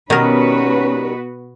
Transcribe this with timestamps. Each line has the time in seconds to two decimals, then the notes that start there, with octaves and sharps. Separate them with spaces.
0.10 B2 D#3 G3 B3 C#4 F#4 A#4 B4